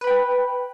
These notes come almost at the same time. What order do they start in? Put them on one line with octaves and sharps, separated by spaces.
B4 B5 G5